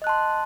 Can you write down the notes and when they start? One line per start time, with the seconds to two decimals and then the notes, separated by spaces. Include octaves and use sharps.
0.02 D#5
0.04 F#6
0.07 A5
0.09 C6